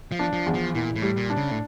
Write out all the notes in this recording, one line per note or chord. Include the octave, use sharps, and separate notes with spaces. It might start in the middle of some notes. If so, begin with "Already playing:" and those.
F3
D4
F3
E2
F3
A#2 E3
A2
G3
A#2
D4
C#3
A2